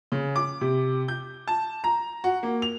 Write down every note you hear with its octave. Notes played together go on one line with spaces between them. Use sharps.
C#3
D6
C3
G6
A5
A#5
F#4
A#3
F7